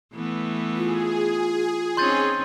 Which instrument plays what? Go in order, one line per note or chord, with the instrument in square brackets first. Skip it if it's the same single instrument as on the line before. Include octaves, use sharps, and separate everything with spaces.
[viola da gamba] E3 A3 B3
[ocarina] F4 [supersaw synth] G#4
[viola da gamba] C4 C#4 D#4 [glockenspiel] C6 G6 A6